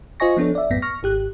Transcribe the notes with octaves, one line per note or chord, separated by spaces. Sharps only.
F4 C5 D#5 G#5 C#6 A#6
F3 B3 D4 A4 C#5
D5 E5
B1 F#2 A2 B3 A#6 B6
C#6 F6 A#6
G#1 G4 F#6